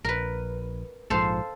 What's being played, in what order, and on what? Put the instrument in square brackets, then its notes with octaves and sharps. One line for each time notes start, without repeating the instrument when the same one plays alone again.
[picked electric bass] A#1 [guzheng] A#4 B4
[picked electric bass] A#1 G#2 F3 [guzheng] A4 C5 F5